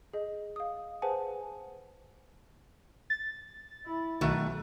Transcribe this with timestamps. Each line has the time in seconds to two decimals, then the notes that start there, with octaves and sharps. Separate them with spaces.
0.13 G#4 D#5
0.56 F5 D#6
1.02 G#4 B4 C5 F#5 G#5 A5
3.10 A6
3.85 E4
4.21 B1 D#3 A3 F#4